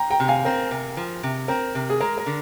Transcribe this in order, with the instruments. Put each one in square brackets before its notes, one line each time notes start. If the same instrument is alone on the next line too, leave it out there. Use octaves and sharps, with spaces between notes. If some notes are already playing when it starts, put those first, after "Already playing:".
Already playing: [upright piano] G5 A#5
G5 A#5
[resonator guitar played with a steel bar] C3
[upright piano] F5 G#5
[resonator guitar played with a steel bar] C4 [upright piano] A#4
[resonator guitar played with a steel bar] C3
F3
C3
[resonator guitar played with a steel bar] C4 [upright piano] A#4
[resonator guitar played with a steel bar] C3
[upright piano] G#4
[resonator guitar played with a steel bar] G#3 [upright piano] A#4
[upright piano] A#4
[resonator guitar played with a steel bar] D3